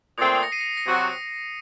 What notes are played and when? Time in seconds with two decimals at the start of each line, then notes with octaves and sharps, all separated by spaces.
0.18 A#2 A3 C4 D#6
0.35 D#6
0.43 A#6 C#7
0.52 C7 D#7
0.60 A#6 C#7
0.69 C7
0.77 A#6 C#7
0.86 C3 F#3 C4 F#4